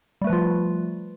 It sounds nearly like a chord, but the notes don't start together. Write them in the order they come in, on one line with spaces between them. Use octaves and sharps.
G3 A3 B4 F3 F4